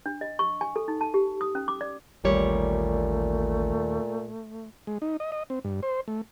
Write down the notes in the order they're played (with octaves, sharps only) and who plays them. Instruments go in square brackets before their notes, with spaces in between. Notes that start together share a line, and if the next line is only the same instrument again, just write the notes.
[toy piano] D4
D#5
C#6
G#5
A4
D#4
A5
G4
D#6
C#4
D6
D5
[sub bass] A1 [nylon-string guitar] D#2 G3 C#5 [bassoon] A#2 [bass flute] A3
[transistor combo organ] G#3
D#4
D#5
D#5
C4
G2
C5
A3